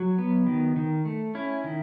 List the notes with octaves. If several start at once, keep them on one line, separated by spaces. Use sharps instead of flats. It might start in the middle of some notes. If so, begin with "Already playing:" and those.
Already playing: F#3 F#4
B3
D#3
D#3
A3
C#4 E4
D#3